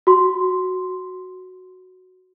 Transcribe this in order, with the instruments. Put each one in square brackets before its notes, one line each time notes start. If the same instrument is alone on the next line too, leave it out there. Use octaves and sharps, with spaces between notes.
[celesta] F#4 C6